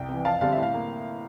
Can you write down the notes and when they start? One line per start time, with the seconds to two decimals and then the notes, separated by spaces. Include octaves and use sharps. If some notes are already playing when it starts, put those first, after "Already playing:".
Already playing: C2 G5
0.09 C3 E3
0.25 F2 F5 A5
0.41 D3 G3 C4 F5
0.52 E5
0.58 A2
0.63 F5
0.74 A#3